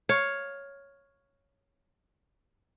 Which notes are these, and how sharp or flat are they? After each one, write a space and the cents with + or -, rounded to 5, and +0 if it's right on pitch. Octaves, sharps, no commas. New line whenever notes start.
C#5 +0 F5 +10